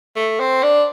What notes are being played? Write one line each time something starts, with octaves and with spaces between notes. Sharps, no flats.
A3
C4
D4